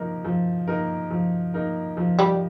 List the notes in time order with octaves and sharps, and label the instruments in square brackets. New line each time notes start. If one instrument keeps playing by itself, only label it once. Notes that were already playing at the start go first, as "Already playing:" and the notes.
Already playing: [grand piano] F3 A#3 D#4 A#4
F3
A#3 D#4 A#4
F3
A#3 D#4 A#4
F3
[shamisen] G3